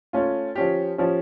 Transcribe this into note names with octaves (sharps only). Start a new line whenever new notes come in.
A3 C#4 F4
F3 C#4 G4
F3 C#4 G4